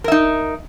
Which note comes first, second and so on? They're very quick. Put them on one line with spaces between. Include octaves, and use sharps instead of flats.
A#4 E5 D#4